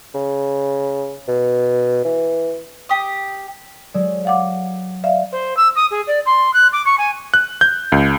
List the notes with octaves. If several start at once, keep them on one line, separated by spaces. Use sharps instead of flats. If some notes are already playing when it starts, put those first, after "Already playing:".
C#3
B2
E3
G4 D#6
F#3 G#3 A4 D5
F5 F#5 D6
D5 E5 F5
C5
E6
D#6
G#4
D5
C6
F#6
D6
C#6
G#5
F#6
G6
C#2